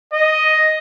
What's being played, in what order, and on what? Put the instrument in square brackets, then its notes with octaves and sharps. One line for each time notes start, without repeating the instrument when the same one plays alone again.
[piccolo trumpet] D#5